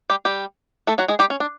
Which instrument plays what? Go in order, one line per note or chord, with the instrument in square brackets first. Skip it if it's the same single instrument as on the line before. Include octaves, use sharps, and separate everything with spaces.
[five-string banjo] G3 G4
G3 G4
A3 A4
F#3 F#4
G#3 G#4
G3 G4
C#4
D4